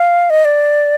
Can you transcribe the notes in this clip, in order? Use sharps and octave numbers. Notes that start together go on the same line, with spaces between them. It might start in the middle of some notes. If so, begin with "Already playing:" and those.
Already playing: F5
D#5
D5